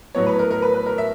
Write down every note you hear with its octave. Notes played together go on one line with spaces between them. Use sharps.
A2 F#3 B3 C#5
B4
A#4
A#4
B4
B4
A#4
E5